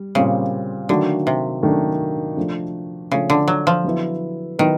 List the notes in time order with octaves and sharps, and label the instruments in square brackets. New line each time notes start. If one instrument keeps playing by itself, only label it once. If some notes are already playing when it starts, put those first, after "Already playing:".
Already playing: [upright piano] G3
[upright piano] A#2 G3 C4 [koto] C#3
[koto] D3 [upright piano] D#3 F#3 A3 D4 F#4
[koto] C3
[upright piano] D#3 F#3 A3 D4 F#4
F3 A3 D4
[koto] C#3 [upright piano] F3 A3 D4
[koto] D3
F#3
F3
[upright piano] F#3 B3 E4
[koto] D#3 [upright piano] F#3 B3 E4